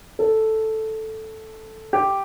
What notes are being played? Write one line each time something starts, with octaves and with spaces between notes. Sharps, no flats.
A4
G4